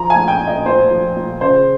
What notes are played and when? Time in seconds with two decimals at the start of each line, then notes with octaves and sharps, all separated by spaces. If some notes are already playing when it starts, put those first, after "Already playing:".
Already playing: F3 A#5
0.10 G#5
0.16 A#2
0.28 G5
0.40 A#2
0.47 D#5
0.66 A#2 C5
0.91 F3
1.16 A#2
1.41 C#3 C5